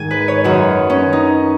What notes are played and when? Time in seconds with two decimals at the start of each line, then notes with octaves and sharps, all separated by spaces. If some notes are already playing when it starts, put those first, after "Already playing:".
Already playing: G#2 D#3 G#5
0.11 B4
0.28 C#5
0.44 F#2 D#3 F#4
0.90 C#4
1.13 D#4